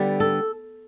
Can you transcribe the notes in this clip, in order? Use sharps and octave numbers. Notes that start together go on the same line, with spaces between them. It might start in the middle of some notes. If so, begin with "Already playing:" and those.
Already playing: D3 G3 B3
A4